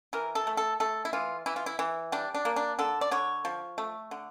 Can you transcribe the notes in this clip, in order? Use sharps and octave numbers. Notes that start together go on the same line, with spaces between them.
E3 A#4
A4
A3
A4
A3 A4
E4
E3 F4
E3 E4
F4
E4
E3
G3 D4
D4
A#3
D4
D3 A4
D5
D3 C#5
F3
A3
D3